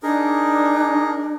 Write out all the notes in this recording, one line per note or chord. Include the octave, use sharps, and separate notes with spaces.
D4 D#4 G#4 A#4